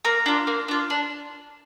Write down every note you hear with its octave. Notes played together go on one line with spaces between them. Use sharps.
A#3 A#5
D4 F4
A#3
D4 F4
D4